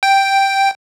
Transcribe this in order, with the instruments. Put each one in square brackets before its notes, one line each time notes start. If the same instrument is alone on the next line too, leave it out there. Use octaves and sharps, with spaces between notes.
[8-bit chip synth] G5